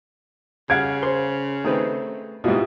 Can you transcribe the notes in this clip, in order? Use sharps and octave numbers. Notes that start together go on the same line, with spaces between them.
C#3 G3 F5 F#5 G#6 D7
C5 C6
D#3 A3 C4 B4
G#2 B2 E4 F4 G4